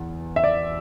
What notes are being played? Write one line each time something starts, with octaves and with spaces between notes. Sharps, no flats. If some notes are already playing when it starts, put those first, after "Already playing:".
Already playing: E2
E5
D5